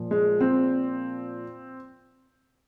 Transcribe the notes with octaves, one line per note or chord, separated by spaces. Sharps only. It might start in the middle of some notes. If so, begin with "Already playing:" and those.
Already playing: A#2 F3
G#3
C4